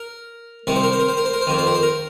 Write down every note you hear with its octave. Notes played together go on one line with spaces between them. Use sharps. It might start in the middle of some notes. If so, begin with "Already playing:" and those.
Already playing: A#4
C2 C3 D#3 A#4
C5
A#4
C5
A#4
C5
A#4
C5
A#4
C5
F2 D#3 A#4
C5
A#4
C5
A#4